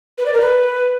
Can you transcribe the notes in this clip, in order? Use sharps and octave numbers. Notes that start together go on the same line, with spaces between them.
B4
D5
A#4
B4